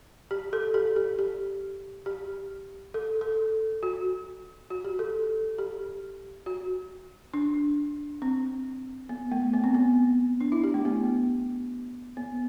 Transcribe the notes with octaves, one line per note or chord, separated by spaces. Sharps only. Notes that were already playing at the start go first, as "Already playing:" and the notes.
G4
A4
G4
G4
G4
G4
A4
A4
F#4
F#4
G4
A4
G4
F#4
D4
C4
B3
A3
B3
C4
B3
D4
E4
G4
A3
B3
B3